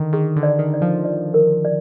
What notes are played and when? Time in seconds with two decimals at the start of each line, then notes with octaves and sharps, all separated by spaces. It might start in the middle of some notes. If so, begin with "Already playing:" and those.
Already playing: D3 D#3
0.13 D#3 G#4
0.36 D3
0.43 D5
0.59 D#3
0.74 D5
0.81 F3
1.05 D5
1.34 A#4
1.65 D5